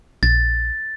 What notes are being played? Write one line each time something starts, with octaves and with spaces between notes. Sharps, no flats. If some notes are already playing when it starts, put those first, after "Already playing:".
A#1 A6